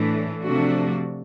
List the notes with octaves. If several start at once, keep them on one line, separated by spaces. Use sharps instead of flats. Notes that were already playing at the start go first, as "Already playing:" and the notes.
Already playing: A2 E3 A3 D4
C3 F3 A3 D4 F#4